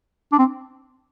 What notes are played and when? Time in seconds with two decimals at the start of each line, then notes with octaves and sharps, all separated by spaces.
0.32 D4
0.38 C4